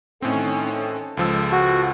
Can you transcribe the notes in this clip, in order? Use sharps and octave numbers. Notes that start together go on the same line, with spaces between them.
A2 D#3 C4 C#4 A4
C#2 F3 G#3 E6
F#4